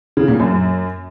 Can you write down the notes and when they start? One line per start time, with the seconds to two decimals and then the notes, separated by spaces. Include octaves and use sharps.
0.17 C#3
0.28 A#2
0.40 F#2